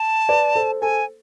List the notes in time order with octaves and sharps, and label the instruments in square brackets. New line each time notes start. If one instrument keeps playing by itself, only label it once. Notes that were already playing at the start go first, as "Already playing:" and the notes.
Already playing: [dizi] A5
[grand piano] B4 D5
A4 C5
[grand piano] A4 C5 [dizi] G#5